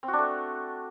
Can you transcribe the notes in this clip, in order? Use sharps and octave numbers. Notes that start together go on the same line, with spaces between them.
C4
F#4
D4
A3